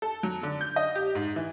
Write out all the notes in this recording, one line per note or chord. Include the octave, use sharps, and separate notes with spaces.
A4
F#3
D3
G6
D#5
G4
G#2
E3